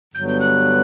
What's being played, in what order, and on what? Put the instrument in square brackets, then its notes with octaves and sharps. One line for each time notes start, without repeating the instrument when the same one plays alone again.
[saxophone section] G2 D3 F#3 B3 [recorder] G6
[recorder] G6
F#6